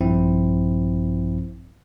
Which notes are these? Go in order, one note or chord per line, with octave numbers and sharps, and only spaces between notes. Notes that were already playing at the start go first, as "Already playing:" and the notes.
A#1 G2 F3 C4 E4